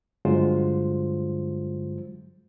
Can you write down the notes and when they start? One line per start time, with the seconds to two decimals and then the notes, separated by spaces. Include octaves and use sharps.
0.25 G2 D3 F#3 G#3 F4 C5